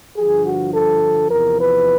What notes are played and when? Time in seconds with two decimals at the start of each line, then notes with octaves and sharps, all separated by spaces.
0.17 G2 D3 F3 G#4
0.46 F#4
0.74 A4
1.31 E2 C3 F3 A#4
1.59 B4